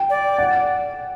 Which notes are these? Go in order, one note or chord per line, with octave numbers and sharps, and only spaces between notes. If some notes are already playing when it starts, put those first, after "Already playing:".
Already playing: G5
D5
F#5